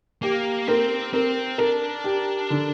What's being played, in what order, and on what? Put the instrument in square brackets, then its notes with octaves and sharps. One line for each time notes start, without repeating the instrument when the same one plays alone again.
[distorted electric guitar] A#3 [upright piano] G4
[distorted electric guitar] C4 [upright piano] A#4
[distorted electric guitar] C4 [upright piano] A#4
[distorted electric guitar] D4 [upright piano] A#4
[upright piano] G4
D3